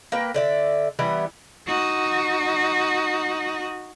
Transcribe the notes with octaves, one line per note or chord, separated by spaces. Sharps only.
A#3 B4 G5
D3 D5 E5
E3 G3 B3 E4
D#4 F#4